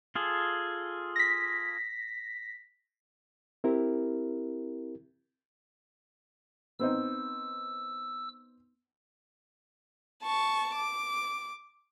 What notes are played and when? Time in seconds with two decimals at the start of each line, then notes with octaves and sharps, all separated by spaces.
0.16 F4 G#4 A4
1.16 A#6 B6
3.64 C4 E4 G4 A#4
6.79 B3 C4 D#4 E6
10.22 A5 C#6
10.73 D6